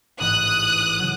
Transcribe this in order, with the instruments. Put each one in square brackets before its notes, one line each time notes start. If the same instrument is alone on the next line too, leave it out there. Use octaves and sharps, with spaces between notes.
[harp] A1 G#2 E3 [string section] D#6 F#6
[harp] C#3 F#3